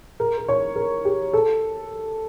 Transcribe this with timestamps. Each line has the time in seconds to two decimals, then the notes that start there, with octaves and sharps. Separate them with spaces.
0.20 A#4
0.37 A#4
0.48 C#5
0.76 A#4
1.05 G4
1.33 A4